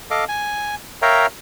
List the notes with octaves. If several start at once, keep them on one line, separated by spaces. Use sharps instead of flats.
A4 D#5 F5 D6
G#5
A#4 C#5 E5 F5 G5 A#5